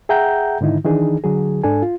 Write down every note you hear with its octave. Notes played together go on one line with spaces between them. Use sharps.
G#4 E5 F#5 G5 A#5 G6
G#2 D3 D#3 D#4 E4
D#3 E3 D4 D#4 G#4
D3 F#3 G#4
G#2 D4 A4 G#5
F4